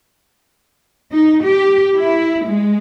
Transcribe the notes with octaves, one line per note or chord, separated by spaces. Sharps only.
D#4
G4
E4
G#3